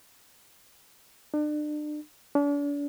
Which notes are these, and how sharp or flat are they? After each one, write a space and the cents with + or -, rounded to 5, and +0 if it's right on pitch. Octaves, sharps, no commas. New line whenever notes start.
D4 +35
D4 -40